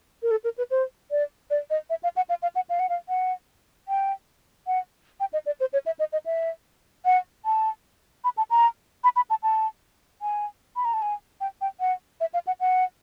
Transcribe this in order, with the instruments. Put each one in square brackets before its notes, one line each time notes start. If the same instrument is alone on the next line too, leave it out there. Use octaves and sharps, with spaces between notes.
[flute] A#4
A4
A#4
B4
C5
D5
D5
D#5
E5
F5
F#5
F5
F5
F#5
F5
F#5
F5
F#5
G5
F#5
G5
D#5
D5
C5
C#5
E5
D#5
D#5
E5
F#5
A5
B5
A5
A#5
B5
B5
A5
A5
G#5
B5
A#5
A5
G#5
G5
G5
F#5
E5
F5
F#5
F#5